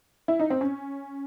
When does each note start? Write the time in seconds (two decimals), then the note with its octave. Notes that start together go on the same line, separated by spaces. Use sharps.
0.28 E4
0.40 D#4
0.50 C4
0.61 C#4